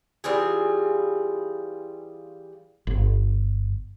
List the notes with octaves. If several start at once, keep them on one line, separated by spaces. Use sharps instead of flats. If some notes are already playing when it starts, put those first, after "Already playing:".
E3 G3 F4 G#4
G1